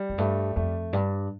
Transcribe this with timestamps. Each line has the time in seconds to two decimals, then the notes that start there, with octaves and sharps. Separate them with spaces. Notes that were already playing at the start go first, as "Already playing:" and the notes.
Already playing: G3
0.10 F2
0.18 G2 A3
0.56 F2 A3
0.93 G2 D4